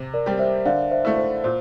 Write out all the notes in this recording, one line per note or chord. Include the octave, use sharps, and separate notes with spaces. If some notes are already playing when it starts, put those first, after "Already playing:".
Already playing: C3
A#4 D5
G3 C4 G4
C5 E5
D3 D5 F5
C5 E5
A3 E4
C5
A#2 C5